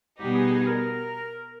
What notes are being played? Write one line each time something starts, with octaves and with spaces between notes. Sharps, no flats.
B2 G3 B3 D#4 G4
G#4
G#4
A#4